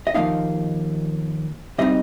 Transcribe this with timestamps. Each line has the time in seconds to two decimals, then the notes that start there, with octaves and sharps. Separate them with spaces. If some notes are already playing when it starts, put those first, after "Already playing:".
0.07 D#5
0.14 D#2 D3 F3 A#3 D#4 F5
1.78 C3 G3 C4 D#4 D#5